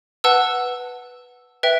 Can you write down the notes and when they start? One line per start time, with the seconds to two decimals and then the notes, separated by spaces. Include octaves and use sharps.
0.24 B4 F#5 A5 E6
1.63 B4 E5 G5